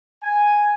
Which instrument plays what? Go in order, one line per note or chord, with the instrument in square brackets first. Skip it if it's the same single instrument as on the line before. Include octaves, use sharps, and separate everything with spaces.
[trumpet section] G#5